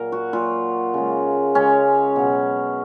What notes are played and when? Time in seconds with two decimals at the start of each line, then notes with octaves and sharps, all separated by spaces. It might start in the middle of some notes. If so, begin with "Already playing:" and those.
Already playing: A#2 F#3 A#4
0.12 F#4
0.33 A#2 F#3 F4
0.94 C#3 G#3
1.55 C#3 G#3 C#4
2.16 B2 F#3